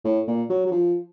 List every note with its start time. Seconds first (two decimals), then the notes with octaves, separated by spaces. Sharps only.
0.04 A2
0.27 A#2
0.49 F#3
0.66 F#3
0.71 F3